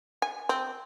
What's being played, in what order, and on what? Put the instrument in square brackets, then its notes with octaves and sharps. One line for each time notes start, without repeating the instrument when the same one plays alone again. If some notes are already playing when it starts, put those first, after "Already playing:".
[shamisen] G#5
C4